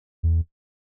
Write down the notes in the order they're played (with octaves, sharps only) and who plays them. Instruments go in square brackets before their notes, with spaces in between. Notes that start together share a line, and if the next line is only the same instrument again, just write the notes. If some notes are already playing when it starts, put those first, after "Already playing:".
[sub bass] E2